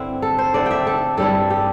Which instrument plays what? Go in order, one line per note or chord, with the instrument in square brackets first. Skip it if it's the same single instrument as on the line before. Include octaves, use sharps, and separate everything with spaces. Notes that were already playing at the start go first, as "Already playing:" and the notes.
Already playing: [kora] G2 D3 C4 E4
A4
C5
D3 A3 C4 E4 D5
E5 G5
A4
G2 G3 E4 A4
G4